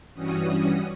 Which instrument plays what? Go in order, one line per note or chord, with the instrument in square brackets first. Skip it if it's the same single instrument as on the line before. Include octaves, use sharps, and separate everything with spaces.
[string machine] G2 E3 G3 C#4 F#4 D#6